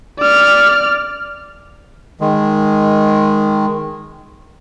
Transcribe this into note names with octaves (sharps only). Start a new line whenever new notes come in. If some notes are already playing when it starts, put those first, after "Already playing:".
D5 F6
D#3 G#3